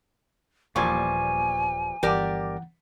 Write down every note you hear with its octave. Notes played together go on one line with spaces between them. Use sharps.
D#1 E2 A#2 F3 G3 G#5 C#6 G#6
G1 E3 G4 A#4 D5 F#5